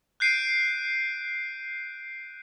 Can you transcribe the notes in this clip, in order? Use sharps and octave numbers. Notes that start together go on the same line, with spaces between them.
F#6 G6 C7 D7 D#7